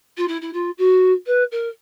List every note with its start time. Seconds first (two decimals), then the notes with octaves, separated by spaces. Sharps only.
0.17 F4
0.28 E4
0.41 E4
0.53 F4
0.78 F#4
1.26 B4
1.51 A#4